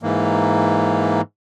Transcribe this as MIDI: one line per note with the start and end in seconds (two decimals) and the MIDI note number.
0.03 1.21 44
0.03 1.21 52
0.03 1.21 58